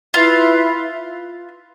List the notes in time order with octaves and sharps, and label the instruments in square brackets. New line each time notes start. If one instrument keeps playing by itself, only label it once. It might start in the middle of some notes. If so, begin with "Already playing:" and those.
[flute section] E4 B4 E5 [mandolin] F4